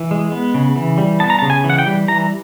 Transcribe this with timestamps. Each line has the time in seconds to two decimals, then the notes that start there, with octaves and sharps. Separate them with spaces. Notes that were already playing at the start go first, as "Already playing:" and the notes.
Already playing: E3
0.11 G#3
0.32 B3
0.54 C#3
0.76 E3
0.98 G3
1.20 B3 A5
1.30 A#5
1.39 A5
1.42 C#3
1.50 G#5
1.64 E3
1.70 F#5
1.79 G5
1.86 G3
2.08 E3 A#5